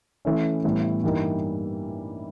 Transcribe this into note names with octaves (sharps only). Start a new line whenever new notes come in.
E3 A3 C#4
A2 E3 G3 B3
G2 E3 G3 A#3 D#4